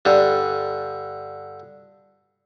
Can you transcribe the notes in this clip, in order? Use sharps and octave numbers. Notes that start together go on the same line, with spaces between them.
G2 D3